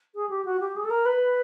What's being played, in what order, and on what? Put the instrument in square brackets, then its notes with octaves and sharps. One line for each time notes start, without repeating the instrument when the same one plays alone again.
[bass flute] G#4
G4
F#4
G4
G#4
A4
A#4
B4